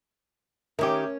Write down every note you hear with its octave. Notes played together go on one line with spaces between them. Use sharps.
D#3 C#4 G4 A#4 E5 D6